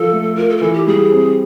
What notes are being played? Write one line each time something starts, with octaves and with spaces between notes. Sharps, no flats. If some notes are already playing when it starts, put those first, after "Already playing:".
Already playing: F3 A4
A3
F4 A#4
A4
A#4
E3 A4
G4
G3 G#4
C4